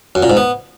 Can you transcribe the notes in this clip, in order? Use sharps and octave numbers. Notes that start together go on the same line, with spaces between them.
F#2
A#2
G#2
B3